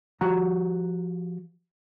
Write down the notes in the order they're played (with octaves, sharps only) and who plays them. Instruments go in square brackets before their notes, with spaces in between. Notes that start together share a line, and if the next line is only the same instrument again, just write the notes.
[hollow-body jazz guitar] F3 F#4 G4 A#5